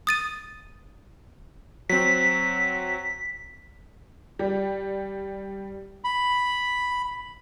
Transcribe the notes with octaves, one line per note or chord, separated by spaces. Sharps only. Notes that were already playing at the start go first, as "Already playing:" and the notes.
D#6 A6 D#7
F#3 C4 B6
G3
B5